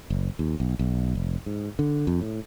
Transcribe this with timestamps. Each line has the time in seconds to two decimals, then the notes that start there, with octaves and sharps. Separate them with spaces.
0.10 F#1
0.39 D#2
0.60 B1
0.79 B1
1.15 F1
1.46 G#2
1.79 D3
2.07 F2
2.21 A2